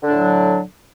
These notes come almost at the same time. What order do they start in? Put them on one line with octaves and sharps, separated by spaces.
D3 D4 A2 F#3